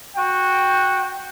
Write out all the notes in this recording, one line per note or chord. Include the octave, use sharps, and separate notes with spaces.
F#4 G5